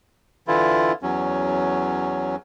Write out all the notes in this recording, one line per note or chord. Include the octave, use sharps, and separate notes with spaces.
D3 E3 E4 F4
E2 F#3 C#4